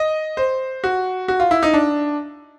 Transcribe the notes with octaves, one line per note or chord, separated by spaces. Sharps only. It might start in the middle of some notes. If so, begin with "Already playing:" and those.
Already playing: D#5
C5
F#4
F#4
F4
E4
D#4
D4